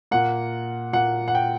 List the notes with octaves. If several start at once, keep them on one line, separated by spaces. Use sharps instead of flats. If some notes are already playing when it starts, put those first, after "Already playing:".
A#2 A#3 F#5
A#2 A#3 F#5
F#5
G5